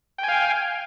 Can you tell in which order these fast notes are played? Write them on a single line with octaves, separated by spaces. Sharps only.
G5 G#5 F5